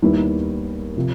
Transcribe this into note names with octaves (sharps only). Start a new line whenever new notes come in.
D#2 D#3 G3 B3 E4
C3 F3